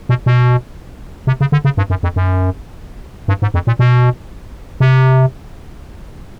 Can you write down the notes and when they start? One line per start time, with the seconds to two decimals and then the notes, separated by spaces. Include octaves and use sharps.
0.09 B2
0.26 B2
1.27 C3
1.41 C#3
1.52 D3
1.65 C#3
1.77 G2
1.90 F#2
2.03 F2
2.16 F#2
3.28 G2
3.42 G#2
3.54 F2
3.67 A#2
3.79 B2
4.80 C3